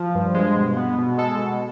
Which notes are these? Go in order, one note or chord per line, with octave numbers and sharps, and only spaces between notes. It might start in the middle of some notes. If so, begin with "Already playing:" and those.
Already playing: F3
G2
G#3
B2
B3
B2
G#3 A4
B2